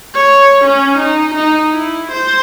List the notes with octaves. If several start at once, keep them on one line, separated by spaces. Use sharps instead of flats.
C#5
C#4
D#4
D#4
E4
C5